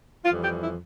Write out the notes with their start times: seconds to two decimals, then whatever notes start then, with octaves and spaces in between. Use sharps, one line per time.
0.25 F2 E3 G3 F4
0.43 G4
0.62 E4